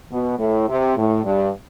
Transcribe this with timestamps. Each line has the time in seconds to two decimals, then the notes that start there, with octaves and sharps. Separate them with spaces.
0.11 B2
0.39 A2
0.69 C3
0.97 A2
1.24 G2